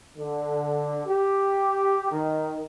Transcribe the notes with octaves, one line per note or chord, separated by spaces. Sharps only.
D3
G4
D#3